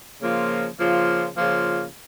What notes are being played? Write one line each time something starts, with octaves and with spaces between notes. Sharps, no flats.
C#3 F3 A#3 F4
C#3 F3 A#3 F4
C#3 F3 A#3 F4